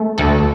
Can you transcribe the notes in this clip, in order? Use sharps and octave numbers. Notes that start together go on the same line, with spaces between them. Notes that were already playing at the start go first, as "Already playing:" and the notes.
Already playing: A3
D2 A4